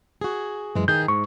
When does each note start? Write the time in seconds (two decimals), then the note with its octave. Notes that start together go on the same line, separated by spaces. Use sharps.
0.21 F#4 G#4
0.75 F#2 E3 G#3
0.88 D#3 G#4 G6
1.08 G#2 C#6